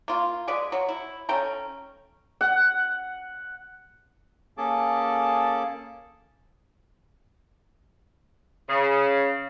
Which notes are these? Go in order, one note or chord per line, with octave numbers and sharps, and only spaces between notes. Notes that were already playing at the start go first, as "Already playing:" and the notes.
A#3 F4
G#3 B4 D5 G#5
F#3
E4
C#4 A4 G5 A#5
F#5
A#3 C#4 G#4 A4 A5 D6
C#3